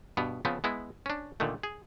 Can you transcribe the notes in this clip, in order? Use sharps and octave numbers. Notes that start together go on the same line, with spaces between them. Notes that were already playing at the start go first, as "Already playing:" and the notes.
G2 B2 B3
C#3 F3 B3 C4
G#3 B3 E4
C#4 D4
A#2 D3 D#3 A3
G#4